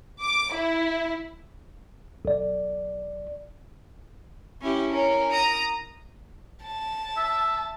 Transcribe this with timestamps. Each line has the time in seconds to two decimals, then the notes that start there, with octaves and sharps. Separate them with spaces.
0.22 D6
0.54 E4
2.25 B1 D5
4.62 C#4 E4 G4
4.91 C#4 A#4
5.32 A#5 D#6
6.65 A5
7.17 E5